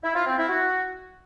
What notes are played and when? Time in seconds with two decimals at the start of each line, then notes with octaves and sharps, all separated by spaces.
0.03 E4
0.15 F4
0.26 C4
0.37 E4
0.49 F#4